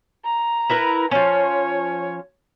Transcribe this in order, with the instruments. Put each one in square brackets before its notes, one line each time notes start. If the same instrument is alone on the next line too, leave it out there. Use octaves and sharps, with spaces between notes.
[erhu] A#5
[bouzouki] E4 A#4 B4
[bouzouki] F3 C#4 [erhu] C#5